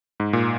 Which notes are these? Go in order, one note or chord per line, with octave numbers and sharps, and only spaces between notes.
G#2
A#2